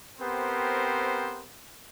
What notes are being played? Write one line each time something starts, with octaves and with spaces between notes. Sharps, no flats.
B3 C4 G4 A#4 C5